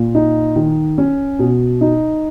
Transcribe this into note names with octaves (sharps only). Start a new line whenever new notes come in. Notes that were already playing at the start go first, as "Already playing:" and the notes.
Already playing: A#2
D#4
D#3
C#4
B2
D#4